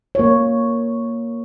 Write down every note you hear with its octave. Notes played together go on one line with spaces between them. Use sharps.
A#3 C#5